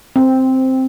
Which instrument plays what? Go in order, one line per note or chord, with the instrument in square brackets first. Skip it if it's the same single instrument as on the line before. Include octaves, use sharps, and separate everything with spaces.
[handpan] C4